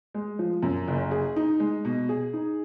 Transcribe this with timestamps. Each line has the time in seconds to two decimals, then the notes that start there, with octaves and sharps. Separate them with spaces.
0.14 G#3
0.39 F3
0.63 F#2
0.88 F#1
1.11 G#4
1.36 D#4
1.60 G#3
1.85 B2
2.09 G#4
2.33 D#4